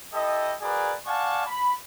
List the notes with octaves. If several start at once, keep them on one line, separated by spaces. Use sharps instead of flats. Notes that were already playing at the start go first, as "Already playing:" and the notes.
E4 G4 A4 D#5
F#4 G#4 A#4 B4 D5
D5 F5 F#5 G#5 A5 C#6
B5